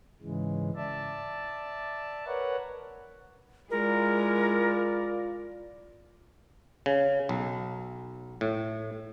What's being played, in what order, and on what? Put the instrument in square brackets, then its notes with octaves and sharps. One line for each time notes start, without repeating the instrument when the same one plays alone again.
[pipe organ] G#2 C#3 E3 G#3
D5 E5 A5
A#4 B4 C#5 F#5
[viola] G#3 E4 [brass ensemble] F4 D5 [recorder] A#4
[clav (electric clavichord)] C#3
B1
A2